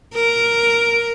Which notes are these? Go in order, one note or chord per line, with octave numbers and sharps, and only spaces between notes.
A#4